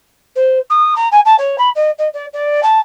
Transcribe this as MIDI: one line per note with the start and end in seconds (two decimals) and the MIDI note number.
0.35 0.58 72
0.70 0.94 87
0.96 1.08 82
1.11 1.20 80
1.25 1.35 81
1.38 1.56 73
1.58 1.69 83
1.75 1.90 75
1.98 2.08 75
2.13 2.25 74
2.33 2.60 74
2.63 2.79 81